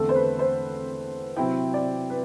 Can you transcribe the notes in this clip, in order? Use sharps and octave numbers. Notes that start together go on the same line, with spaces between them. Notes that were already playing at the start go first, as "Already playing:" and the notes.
Already playing: E2 D3 A3 C4 A4
C5
B4
C5
C3 F#3 C4 E4 G5
D5
B4